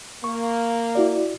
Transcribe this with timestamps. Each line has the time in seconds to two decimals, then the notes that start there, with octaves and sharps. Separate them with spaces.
0.24 A#3 C#6
0.95 E4 F#4 D5